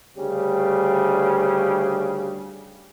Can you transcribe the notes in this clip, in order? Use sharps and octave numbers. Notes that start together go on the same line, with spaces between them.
D2 C#3 G3